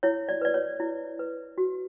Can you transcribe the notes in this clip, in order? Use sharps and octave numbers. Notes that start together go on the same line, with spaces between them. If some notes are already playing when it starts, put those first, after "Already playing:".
E4 C#5
D5
B4 D5
C#5
E4
B4
F#4